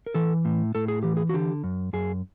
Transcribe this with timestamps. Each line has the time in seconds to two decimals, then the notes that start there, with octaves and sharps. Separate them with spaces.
0.06 A#4
0.15 E3 A4
0.45 A2
0.75 A2 A4
0.88 G#4
1.03 E3 G4
1.17 G#4
1.29 F#4
1.34 D3 G4
1.64 F#2
1.93 F#2 G#4